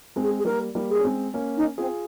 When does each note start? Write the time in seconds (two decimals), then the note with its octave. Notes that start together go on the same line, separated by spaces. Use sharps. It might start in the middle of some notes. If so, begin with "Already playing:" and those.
0.16 G#3 C4
0.23 G#4
0.39 G#4
0.45 G3 A#3 A#4
0.75 G3 A#3
0.90 G#4
0.99 C#4
1.04 G#3 C4
1.34 A#3 C#4
1.57 D#4
1.78 C4 F4 G#4